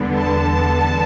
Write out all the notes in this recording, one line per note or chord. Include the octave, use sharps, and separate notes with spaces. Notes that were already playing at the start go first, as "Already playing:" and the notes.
Already playing: E2 D3 G3 B3
A5